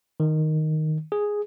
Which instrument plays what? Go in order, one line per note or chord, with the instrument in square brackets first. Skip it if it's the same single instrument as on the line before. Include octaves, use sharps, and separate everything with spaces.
[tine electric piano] D#3
G#4